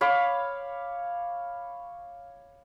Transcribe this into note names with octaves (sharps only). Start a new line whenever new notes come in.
C#5 F5 B5 D6